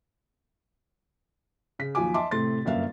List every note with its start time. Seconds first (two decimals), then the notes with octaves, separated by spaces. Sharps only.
1.79 C#3 B6
1.95 D#2 F3 F#3 G#5 D6
2.14 D#5 E5 A5 C6 D6
2.31 A2 C3 A3 C6 A6
2.65 G1 F#2 A#3 E5 F5